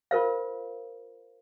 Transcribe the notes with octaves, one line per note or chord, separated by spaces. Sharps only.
F4 A#4 C5 F5